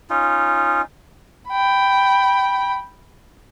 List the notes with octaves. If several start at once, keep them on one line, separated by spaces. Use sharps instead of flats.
C#4 D#4 F4
G5 B5